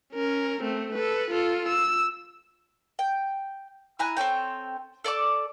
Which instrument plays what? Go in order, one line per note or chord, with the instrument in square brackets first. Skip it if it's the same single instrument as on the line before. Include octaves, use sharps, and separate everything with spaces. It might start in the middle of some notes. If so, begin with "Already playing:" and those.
[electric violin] C#4 A#4
A3 C4
A4 B4
F4 A4
E6
[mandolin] G5
E4 G#5 A#5 F#6
C4 A4 C#5 G5
A4 D5 A5 D6